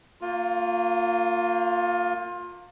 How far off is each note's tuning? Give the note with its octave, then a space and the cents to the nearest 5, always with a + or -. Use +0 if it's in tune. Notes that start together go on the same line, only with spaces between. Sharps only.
A#3 -25 F4 +20